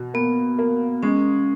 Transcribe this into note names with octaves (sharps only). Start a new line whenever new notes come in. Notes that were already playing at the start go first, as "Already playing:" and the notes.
Already playing: B2
A#3 B3
A#3
G#3 C#4